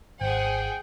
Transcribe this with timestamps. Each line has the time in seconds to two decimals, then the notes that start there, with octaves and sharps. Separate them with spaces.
0.21 G#1 G#4 C5 F#5 G5